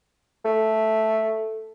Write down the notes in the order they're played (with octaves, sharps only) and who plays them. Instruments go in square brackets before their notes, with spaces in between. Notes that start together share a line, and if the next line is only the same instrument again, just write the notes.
[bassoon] A3